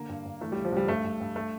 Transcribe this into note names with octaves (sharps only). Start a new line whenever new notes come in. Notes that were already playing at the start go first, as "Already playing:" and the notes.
Already playing: D3 A#3
G2
G2
E3 A3
C#2 G3
F3
C#2 G3
G2 A3
G2
G2
A3